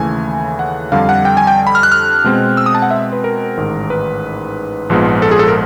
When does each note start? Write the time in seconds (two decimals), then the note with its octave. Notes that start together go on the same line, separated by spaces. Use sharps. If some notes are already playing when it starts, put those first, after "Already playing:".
Already playing: D#2 C#3 E3 A3 G#5
0.59 F#5
0.92 F2 D3 G3 F5
1.09 F#5
1.25 G5
1.37 G#5
1.47 G5
1.67 B5
1.75 F6
1.83 F#6
1.92 F6
2.24 B2 G#3 C4
2.57 E6
2.66 D#6
2.75 A5
2.82 F#5
2.91 E5
3.13 B4
3.24 A#4
3.57 A1 G#2 D#3
3.90 B4
4.90 A#1 G#2 F3 G#3 B3
5.22 A4
5.31 G#4
5.39 A4
5.48 A#4